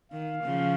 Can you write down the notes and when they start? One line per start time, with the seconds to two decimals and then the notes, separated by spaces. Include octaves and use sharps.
0.12 D#3 F5
0.44 C#3 F3